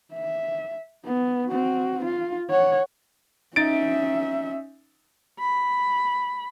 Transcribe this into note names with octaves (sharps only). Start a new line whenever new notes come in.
E5
B3
C4 F#4
F4
C#5 F#5
C#4 D#4 E5 A6 D7
B5